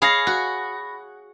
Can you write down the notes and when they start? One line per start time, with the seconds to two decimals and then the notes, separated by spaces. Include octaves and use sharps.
0.02 G#4 C#5 F5 B5 A#6
0.27 F#4